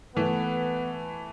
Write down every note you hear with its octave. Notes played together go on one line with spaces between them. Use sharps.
E3 A3 B3